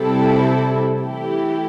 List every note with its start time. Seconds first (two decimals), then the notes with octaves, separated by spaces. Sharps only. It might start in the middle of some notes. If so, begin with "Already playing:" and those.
Already playing: C3 G3 C4 E4 A4
1.01 E3 A3 E4 G4